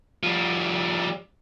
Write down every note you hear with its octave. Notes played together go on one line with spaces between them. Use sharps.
F3 G3